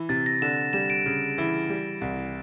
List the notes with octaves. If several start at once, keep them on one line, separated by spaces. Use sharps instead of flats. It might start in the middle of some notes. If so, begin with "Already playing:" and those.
Already playing: E3
C3 A6
A#6
D3 E7
G3 E7
D7
C#3
E3
G3
C2